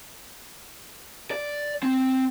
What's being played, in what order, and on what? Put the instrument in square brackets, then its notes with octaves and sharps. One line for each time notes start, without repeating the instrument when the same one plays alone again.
[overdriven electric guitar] D5
C4